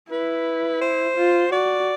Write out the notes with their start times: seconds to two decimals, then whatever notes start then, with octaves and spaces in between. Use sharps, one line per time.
0.11 E4 B4
0.82 C5
1.16 F4
1.52 F#4 D5